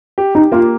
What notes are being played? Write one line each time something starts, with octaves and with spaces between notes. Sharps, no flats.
G4
D#4 G4
A#3 F4